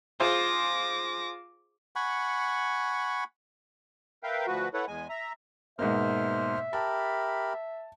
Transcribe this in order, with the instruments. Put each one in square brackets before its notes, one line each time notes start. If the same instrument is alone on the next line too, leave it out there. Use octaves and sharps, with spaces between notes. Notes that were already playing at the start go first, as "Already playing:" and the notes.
[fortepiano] F4 G#4 C5 [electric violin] D6 A#6
[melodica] F#5 G#5 B5 C#6
[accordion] A#4 B4 E5 F5 G5
D2 F3 F#4 B4
E4 A4 B4 C#5 F#5
E2 G#3 G#5
E5 A#5
[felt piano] G#2 B2 A#3 [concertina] C5 F6 [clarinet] E5
[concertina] G4 A#4 B5 [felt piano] A5